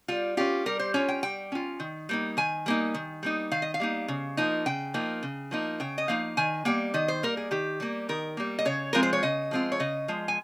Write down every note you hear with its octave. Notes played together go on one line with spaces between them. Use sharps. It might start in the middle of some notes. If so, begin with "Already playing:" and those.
G3 F4
C#4 F4 G4
G3 A#4
C5
C#4 F4 C#5
G5
G3 G5
C#4 F4
D#3
G3 A#3 D#4
D#3 G#5
G3 A#3 D#4
D#3
G3 A#3 D#4
D#3 F5
D#5
F5
G3 A#3 D#4
C#3
F3 A#3 D#4
C#3 G5
F3 A#3 D#4
C#3
F3 A#3 D#4
C#3 G5
D#5
F3 A#3 D#4 F5
D#3 G#5
G3 A#3 G5
D#3 D#5
C5
G3 A#3 A#4
G#4
D#3 G4
G3 A#3
D#3 A#4
G3 A#3
D#5
C#3 C#5
F3 G#3 C4 F4 A#4
C5
C#5
C#3 D#5
F3 G#3 C4 F4
C#5
C#3 D#5
F3 G#3
G#5